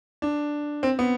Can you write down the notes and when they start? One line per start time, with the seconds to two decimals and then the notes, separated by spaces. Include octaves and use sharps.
0.22 D4
0.83 C4
0.99 B3